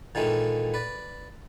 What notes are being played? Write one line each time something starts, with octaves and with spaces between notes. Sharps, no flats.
A#2 D#3 E3 G#3 A3
B4 D5